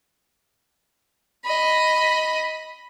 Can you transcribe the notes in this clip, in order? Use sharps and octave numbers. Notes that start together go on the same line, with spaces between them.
D#5 B5